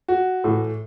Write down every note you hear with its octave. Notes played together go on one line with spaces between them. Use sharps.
F#4
A2 E3